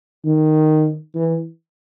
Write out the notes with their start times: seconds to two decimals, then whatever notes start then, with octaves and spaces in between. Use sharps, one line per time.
0.25 D#3
1.15 E3